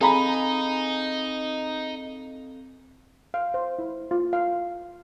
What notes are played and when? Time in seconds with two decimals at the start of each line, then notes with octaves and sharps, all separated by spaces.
0.01 C4 D#4 G#4 A4 F5 A#5 B5
3.34 F5
3.54 C5
3.79 E4
4.11 F4
4.33 F5